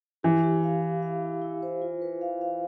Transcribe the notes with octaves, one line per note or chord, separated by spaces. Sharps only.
E3 G4
G4
F5
F5
F5
E4
E4
C5
F4
B4
F5
F5